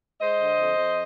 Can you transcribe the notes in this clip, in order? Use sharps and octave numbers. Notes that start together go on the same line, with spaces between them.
G#3 C5 D#5
D3
F2
F2